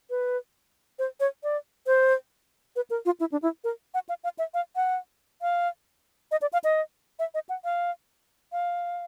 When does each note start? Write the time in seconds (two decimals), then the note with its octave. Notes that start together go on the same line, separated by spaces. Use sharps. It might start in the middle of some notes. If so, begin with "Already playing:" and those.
0.10 B4
0.99 C5
1.20 C#5
1.43 D5
1.87 C5
2.76 B4
2.90 A#4
3.05 F4
3.20 E4
3.32 D4
3.42 E4
3.64 A#4
3.94 F#5
4.09 F5
4.24 F5
4.39 E5
4.54 F5
4.76 F#5
5.42 F5
6.31 D#5
6.42 D5
6.53 F5
6.64 D#5
7.19 E5
7.34 D#5
7.49 F#5
7.64 F5
8.52 F5